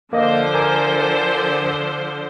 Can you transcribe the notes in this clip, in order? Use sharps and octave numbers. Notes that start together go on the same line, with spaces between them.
D3 F3 A#3 C5 D#5
A#4 G#5 D6